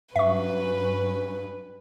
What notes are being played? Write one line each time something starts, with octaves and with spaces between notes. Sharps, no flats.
G2 F#3 C#4 B4 E5 C#6